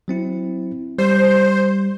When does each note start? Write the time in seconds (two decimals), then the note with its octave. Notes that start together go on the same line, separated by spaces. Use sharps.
0.08 F#3 C4 E4
0.98 G3 C5